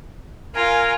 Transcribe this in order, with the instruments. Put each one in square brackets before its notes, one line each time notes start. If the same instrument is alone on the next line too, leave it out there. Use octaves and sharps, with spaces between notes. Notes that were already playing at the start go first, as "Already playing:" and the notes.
[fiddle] F4 [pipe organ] A#4 G#5